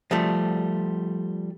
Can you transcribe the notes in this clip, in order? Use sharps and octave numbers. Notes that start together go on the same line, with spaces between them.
F3 G3 A3